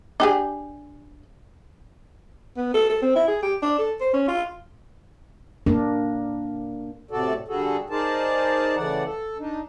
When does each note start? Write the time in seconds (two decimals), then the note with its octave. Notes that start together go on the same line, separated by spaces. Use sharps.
0.20 D4 G4 G#4
2.57 B3
2.74 A4
2.90 A4
3.02 C4
3.16 E4
3.28 G#4
3.42 G4
3.62 D4
3.79 A4
4.01 C5
4.13 C#4
4.28 F4
5.66 A#3 D4 A#4
7.11 A2 C3 F#4 A4 D5
7.48 D3 G3 F#4 G#4 A4
7.90 D#4 G#4 A#4 C5 D5 A5
8.76 C#3 E3 A3 D5 F#5
9.05 A4
9.38 D4 D#4